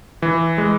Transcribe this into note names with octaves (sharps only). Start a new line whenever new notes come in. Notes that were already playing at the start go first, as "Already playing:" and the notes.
E3
G#3